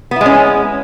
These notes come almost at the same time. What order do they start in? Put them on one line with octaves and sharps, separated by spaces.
B3 E4 G#3 C#4